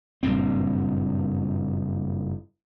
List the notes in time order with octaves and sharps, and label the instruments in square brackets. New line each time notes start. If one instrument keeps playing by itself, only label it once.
[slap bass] F#1 G2 A#2 C4